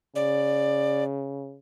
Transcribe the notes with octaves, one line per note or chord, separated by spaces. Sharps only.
C#3 D5